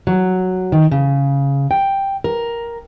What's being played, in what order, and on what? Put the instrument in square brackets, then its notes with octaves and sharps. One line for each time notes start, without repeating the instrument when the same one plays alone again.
[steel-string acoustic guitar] F#3
D#3
C#3
G5
A#4